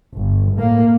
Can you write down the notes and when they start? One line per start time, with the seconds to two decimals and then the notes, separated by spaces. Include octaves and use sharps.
0.14 G1
0.56 A2 A#3